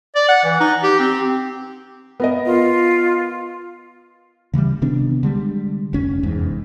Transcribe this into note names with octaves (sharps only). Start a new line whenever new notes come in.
D5
F#5
E3
D#4
G4
C4
B3 A#4 D#5
F4
C#3 E3 F3 G3
C3 D#3 B3 D4
D3 G3 G#3
F1 C#4
F1 E2 G#2